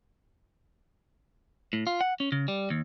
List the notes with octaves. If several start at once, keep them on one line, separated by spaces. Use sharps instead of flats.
A2
F4
F#5
C#4
C#3
G3
D#2